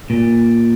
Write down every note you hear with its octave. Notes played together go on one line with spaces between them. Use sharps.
A#2